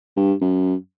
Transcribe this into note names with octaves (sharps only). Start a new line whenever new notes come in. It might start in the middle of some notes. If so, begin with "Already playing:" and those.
G2
F#2